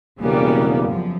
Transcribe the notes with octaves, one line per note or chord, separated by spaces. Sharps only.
E1 C#3 G3 A#3 B3
F#2 F3